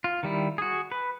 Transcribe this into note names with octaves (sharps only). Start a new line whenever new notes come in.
F4
D#3 G3 E4
F#4 G#4
B4